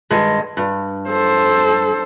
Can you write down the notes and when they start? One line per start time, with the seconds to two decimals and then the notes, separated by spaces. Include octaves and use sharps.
0.10 G2 D#3 G#3
0.57 G2
1.08 A4 C5